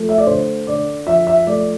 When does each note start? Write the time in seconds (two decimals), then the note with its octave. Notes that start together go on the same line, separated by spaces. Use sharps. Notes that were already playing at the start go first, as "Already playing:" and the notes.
Already playing: F3 A3
0.09 E5
0.18 D5
0.27 D3 C5
0.67 D3 D5
1.07 F3 E5
1.27 E5
1.47 A3 D5